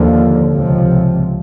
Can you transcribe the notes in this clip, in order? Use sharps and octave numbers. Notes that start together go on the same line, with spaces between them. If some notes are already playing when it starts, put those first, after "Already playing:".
Already playing: D#2 D3 F3 A#3
C#2 C3 F3